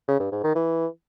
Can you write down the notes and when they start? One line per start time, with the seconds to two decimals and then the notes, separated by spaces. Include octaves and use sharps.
0.08 C#3
0.20 G2
0.32 G#2
0.43 D#3
0.55 E3